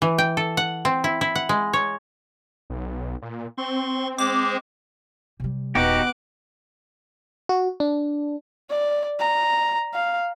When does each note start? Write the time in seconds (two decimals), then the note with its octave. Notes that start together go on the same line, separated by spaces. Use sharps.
0.02 E3
0.18 G5
0.37 A4
0.57 F#5
0.85 C4
1.04 E4
1.21 E4
1.35 F#5
1.49 G#3
1.73 C#5
2.70 B1
3.22 A#2
3.58 C4 C6 C#6
4.18 G#3 G#4 C5 D6
5.40 C3 G3
5.75 D#1 B3 D#4 F#4 G4 D6 F#6
7.49 F#4
7.80 D4
8.70 D5
9.19 A#5
9.94 F5